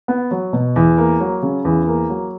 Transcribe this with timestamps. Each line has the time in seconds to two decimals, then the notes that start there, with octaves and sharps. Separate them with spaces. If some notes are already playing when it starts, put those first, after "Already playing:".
0.08 B3
0.31 F#3
0.53 B2
0.76 E2
0.98 A#3
1.20 F#3
1.43 C#3
1.65 E2
1.88 A#3
2.10 F#3